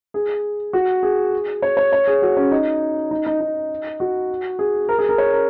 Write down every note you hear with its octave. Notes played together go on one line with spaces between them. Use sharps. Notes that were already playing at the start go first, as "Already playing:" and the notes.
G#4
F#4
G#4
C#5
C#5
C#5
G#4
F#4
C#4
D#4
D#4
D#4
D#4
F#4
G#4
A#4
G#4
A#4
C#5
A#4